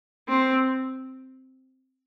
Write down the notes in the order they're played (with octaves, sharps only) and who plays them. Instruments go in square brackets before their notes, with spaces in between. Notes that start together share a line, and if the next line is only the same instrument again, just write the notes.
[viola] C4